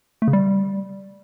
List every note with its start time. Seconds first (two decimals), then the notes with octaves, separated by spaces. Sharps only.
0.22 A3
0.28 C#3
0.33 G3